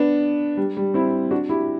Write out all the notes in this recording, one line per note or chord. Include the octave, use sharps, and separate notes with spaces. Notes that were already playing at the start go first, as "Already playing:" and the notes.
Already playing: B3 D4
G3
G3
C4 E4
D4 F#4
E4 G4